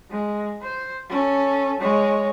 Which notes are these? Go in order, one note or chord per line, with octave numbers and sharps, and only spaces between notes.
G#3
C5
C#4 A4
G#3 C#5